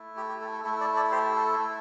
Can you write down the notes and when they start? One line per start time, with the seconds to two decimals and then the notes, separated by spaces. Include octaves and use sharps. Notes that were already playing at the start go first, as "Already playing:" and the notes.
Already playing: A3 E4
0.17 G4
0.29 G4
0.41 A4
0.52 A4
0.64 A3 E4 A4
0.80 A4 D5
0.96 A4 D5
1.12 G4 C5
1.36 A4
1.59 A3 E4